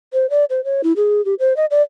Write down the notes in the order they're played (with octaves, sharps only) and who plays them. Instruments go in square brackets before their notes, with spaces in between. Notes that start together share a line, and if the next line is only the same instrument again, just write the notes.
[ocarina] C5
D5
C5
C#5
E4
G#4
G4
C5
D#5
D5